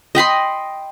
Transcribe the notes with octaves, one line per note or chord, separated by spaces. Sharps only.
D#5 G5 B5 C6